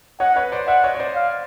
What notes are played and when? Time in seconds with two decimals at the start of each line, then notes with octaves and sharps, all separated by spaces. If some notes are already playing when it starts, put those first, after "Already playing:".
0.20 C#5 D#5 F#5
0.36 B4 C#5
0.52 C5 D5
0.67 D5 E5 F#5
0.84 C#5 D#5
0.95 C#5
0.99 C5 D5
1.15 F5